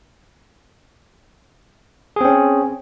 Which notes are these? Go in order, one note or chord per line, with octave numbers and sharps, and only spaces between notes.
C4 C#4 G#4